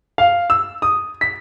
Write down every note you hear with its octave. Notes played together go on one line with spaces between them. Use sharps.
F5
E6
D#6
B6